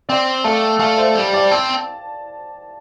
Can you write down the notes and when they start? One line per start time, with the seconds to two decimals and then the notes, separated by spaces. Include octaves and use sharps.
0.09 C4 D5 G5
0.44 A3 F5 A5
0.79 A3 F5 A5
0.98 C5 F5
1.15 G3
1.34 D5 G5
1.51 C4 A5